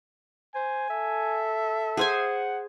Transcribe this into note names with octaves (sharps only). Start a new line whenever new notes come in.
C5 G#5
A4 E5
G#4 C5 F#5 G#5